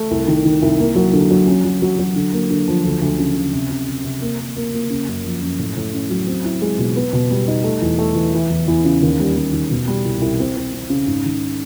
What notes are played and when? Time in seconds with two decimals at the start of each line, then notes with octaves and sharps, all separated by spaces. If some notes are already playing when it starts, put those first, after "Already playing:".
Already playing: A3
0.11 C2
0.28 D#3
0.45 D#3
0.62 C2
0.79 A#3
0.95 F#3
1.13 D3
1.31 F#3
1.47 C#4
1.64 F#3
1.82 F#3
1.99 F#3
2.16 D3
2.33 A#3
2.50 D3
2.68 F3
2.84 D2
3.02 D2
3.19 C#3
3.35 C#3
3.53 C3
3.70 C3
3.88 C3
4.04 C3
4.21 A#3
4.39 A#3
4.56 A#3
4.73 A#3
4.90 C#3
5.08 F#2
5.24 F3
5.42 F#2
5.59 A2
5.77 A2
5.94 C#4
6.10 F#3
6.27 C4
6.45 E4
6.62 G#3
6.79 B2
6.96 B3
7.13 B2
7.30 G3
7.48 D#4
7.64 A3
7.82 E2
7.99 A3
8.15 E3
8.34 E3
8.50 E2
8.68 E2
8.85 C#3
9.02 D#2
9.20 G3
9.36 G3
9.53 D#3
9.71 B2
9.87 G3
10.04 C2
10.21 C2
10.40 C4
10.56 C4
10.73 C4
10.90 C#3
11.07 G#2
11.25 D#3